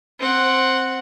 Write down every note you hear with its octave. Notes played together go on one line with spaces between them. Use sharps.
C4 F#5